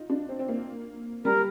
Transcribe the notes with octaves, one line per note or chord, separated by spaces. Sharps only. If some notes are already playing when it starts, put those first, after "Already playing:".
Already playing: D#4 F4
D4
C4
C4
A#3
G3 A#4